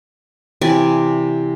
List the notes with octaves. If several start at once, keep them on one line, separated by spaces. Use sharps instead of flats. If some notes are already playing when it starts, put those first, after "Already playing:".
C3 E3 D5 G#5